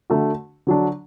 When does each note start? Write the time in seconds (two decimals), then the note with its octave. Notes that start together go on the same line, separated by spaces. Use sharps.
0.10 D3 A3 F#4
0.67 D3 F#3 D4